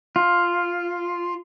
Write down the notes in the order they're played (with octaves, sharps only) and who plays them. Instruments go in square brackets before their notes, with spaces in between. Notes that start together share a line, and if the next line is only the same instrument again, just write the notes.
[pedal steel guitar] F4